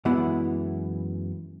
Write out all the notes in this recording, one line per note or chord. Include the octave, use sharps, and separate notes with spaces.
F#2 E3 G#3 B3 E4 F#5